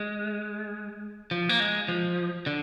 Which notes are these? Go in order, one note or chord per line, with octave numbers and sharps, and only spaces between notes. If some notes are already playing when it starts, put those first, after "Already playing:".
Already playing: G#3
F3
A#3
G#3
F3
D3